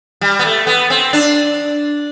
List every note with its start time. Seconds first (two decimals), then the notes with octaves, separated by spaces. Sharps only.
0.21 G3
0.39 B3
0.45 A3
0.67 B3
0.90 C4
1.13 D4